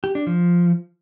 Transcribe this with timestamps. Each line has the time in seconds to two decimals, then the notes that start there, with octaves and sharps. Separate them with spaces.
0.04 G4
0.15 D4
0.27 F3